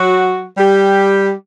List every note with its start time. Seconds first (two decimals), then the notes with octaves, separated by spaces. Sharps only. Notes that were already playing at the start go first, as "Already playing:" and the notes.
Already playing: F#3 F#4
0.57 G3 G4